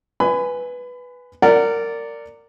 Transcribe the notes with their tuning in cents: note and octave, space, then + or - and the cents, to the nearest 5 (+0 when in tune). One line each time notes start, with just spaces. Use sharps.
B4 +0 G#5 +0 B5 +30
A#4 -20 D5 -10 F#5 +0